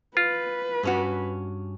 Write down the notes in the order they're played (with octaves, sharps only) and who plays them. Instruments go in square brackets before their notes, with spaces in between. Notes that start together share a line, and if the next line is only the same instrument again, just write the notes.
[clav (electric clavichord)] F4 [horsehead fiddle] B4
[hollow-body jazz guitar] G2 C#4 F#4